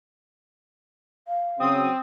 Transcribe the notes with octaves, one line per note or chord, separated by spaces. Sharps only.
F5
C#3 F#3 C4 D#6